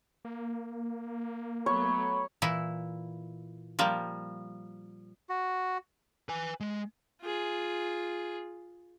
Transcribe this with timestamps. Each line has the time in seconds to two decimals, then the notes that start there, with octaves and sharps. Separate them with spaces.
0.25 A#3
1.66 F#3 A3 B3 C#5 B5
2.42 A#2 E3 E4
3.79 F3 G3 A#3
5.29 F#4
6.29 B4 G#5
6.60 G#3
7.22 F4 G#4